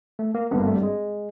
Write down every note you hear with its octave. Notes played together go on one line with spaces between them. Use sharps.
A3
A#3
G#1 G2 D3 G3 B3
A#3
A3
G3
G#3